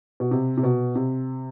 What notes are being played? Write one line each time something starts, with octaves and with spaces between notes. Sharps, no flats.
B2
C3
C3
B2
C3